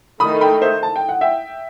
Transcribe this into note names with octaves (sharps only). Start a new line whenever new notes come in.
D#3 A3 D#4 B5 D#6
G5 B5
C5 E5
A5
G5
F#5
E5 G5